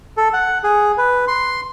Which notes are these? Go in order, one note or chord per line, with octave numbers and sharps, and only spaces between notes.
A4
F#5
G#4
B4
C6